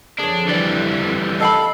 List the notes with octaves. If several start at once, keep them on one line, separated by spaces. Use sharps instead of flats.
F2 D3 F3 D4 G#4 C#5
E3 G3 D5
A4 D#5 F5 B5